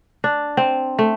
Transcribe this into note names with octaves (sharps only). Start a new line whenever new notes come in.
D4
C4
A3